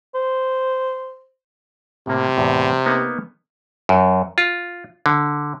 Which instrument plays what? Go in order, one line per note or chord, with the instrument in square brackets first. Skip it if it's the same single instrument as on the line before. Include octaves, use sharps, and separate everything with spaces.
[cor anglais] C5
[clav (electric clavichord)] A2 A#3 [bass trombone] C3
[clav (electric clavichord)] E2 A2
A#3 B3 D#4
F#2
F4
D3